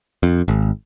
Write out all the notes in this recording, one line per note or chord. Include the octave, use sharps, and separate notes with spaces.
F2
G#1